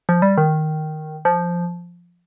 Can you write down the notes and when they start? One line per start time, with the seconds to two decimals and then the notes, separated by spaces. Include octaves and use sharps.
0.09 F3
0.22 G3
0.37 D#3
1.25 F3